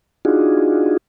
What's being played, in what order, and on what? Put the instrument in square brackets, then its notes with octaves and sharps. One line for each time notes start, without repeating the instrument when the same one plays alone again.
[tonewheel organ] D4 D#4 F4 F#4 G#4